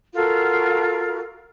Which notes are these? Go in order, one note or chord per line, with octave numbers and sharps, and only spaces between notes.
F4 F#4 A4 A#4